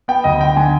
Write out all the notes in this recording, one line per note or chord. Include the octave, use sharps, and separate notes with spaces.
B3 G5
D2 D#5
D3 G5
D3 G#5